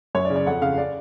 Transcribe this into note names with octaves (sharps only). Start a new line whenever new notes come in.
F#2 C#5
D5
C#3
D5
F2 F#5
C#3 F5
D5